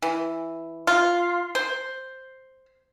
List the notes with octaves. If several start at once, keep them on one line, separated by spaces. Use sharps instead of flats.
E3
F4
C5